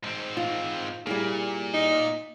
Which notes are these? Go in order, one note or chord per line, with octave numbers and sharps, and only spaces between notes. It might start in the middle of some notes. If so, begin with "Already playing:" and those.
G#2 C4
F4
A#2 G3 E4 G#4
D#4